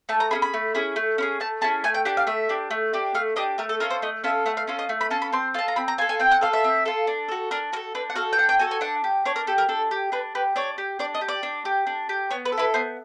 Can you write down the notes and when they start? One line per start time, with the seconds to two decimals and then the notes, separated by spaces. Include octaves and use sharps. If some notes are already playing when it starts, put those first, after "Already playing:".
0.09 A3 A5
0.20 A#5
0.31 E4 G#4 B5
0.35 C#4
0.42 B5
0.54 A3
0.75 C#4 E4 G#4
0.96 A3
1.18 C#4 E4 G#4
1.40 A3 A5
1.61 C#4 E4 G#4 A5
1.84 A3 G#5
1.94 G5
2.05 D4 G4 F#5
2.17 F5
2.27 A3 E5
2.49 D4 G4
2.71 A3
2.94 D4 G4
3.15 A3 F5
3.36 D4 G4 D#5
3.58 A3 A#4
3.69 A4
3.80 C#4 F4 A4 A#4
3.90 C5
4.02 A3 D#5
4.24 C#4 F4 A4 E5
4.46 A3 F#5
4.57 F5
4.67 C#4 F4 A4
4.79 D#5
4.89 A3
5.01 B5
5.10 C#4 F4 A4 A5
5.22 B5
5.33 C4 C6
5.54 F4 A4 A5
5.68 A#5
5.76 C4 B5
5.88 A#5
5.98 F4 G#5
6.01 A4
6.09 G#5
6.19 C4 G5
6.31 F#5
6.41 F4 A4 F5
6.53 E5
6.64 C4
6.85 F4 A4
7.07 D4
7.29 F#4 A4
7.51 D4 A#4
7.73 F#4 A#4
7.76 A4
7.95 D4 B4
8.10 F#5
8.16 F#4 A4 F5
8.33 G5
8.38 D4 F#5
8.49 G5
8.59 F#4 A4 G#5
8.71 G#5
8.81 D4 F#5
9.04 G4
9.25 D4 C#5
9.36 A#4
9.47 G4 A4
9.58 A#4
9.68 D4 A4
9.91 G4
10.12 D4 B4
10.35 G4 B4
10.56 D4 C#5
10.78 G4
10.99 D4 D5
11.15 D#5
11.21 G4
11.28 D5
11.43 D4
11.65 G4
11.87 D4
12.09 G4
12.31 B3 C#5
12.45 B4
12.52 A4
12.58 E4 B4
12.74 B3 C5